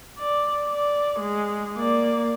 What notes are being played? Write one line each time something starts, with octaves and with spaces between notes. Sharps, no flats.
D5
D5
G#3
A#3 D5